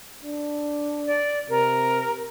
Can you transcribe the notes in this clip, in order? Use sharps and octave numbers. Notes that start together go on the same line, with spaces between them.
D4
D5
C3 A#4